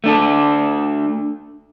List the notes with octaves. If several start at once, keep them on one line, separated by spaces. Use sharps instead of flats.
A3 D4 A4